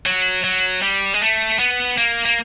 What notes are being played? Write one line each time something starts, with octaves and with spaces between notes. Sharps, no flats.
F#3
F#3
G3
G#3
A3
B3
A#3
A#3